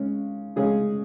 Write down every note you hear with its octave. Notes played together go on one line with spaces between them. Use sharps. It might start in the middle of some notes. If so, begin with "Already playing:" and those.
Already playing: C#3 G#3 C#4
C#3 G#3 C#4 G#4